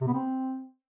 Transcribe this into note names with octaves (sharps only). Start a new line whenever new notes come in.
C3
B3
C4